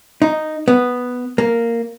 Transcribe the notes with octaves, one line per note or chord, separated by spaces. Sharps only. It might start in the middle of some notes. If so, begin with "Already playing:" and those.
D#4
B3
A#3